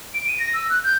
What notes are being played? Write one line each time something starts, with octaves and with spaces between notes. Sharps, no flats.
D7
D#7
A#6
E6
F#6
G6